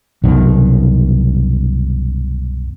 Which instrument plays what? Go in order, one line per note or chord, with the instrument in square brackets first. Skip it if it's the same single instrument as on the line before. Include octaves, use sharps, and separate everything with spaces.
[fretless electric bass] C2 F#2 B2 D#3